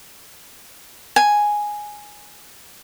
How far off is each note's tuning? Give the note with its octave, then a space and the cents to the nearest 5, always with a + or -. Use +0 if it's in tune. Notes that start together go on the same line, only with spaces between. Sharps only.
G#5 +0